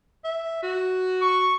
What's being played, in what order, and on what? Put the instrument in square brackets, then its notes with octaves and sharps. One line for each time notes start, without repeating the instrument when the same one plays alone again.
[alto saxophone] E5
F#4
[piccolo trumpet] C#6